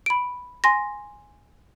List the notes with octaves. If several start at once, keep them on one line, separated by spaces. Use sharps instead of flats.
B5 D7
G#5 C6 A#6